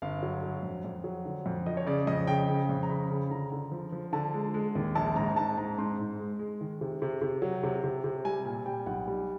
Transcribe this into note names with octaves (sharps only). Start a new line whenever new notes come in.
G1 F5
F#3
F#3
F2
F2
F#3
D3
F2
F3 D#5
C#5
C#3 D5
F2 D#5
C#3 G5
C#3
F2
A#5
C#3 B5
C#3
D3 A#5
D3
F3
F3
D3 A5
G#3
G#3
D#2
A#1 A5
G#2 A#5
G#2 A5
G#2 A#5
G#2 C6
G#2
G#3
G#3
D#3
C3
C3
C3
F#3
C3
C3
C3
G3 G#5
A#2 G#5
G3 G5
B1 F#5
G3